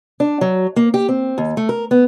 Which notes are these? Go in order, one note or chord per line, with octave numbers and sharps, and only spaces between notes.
D4
F#3
A#3
G4
C4
D#2
A3
A#4
B3